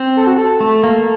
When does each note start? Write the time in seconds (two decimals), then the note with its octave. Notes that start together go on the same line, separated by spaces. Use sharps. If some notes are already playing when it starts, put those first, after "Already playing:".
Already playing: C4
0.17 A4
0.27 F#4
0.38 A4
0.60 A3
0.83 A#3